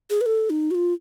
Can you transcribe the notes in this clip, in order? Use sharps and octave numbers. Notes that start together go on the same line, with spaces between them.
G#4
B4
A4
D#4
F#4
F4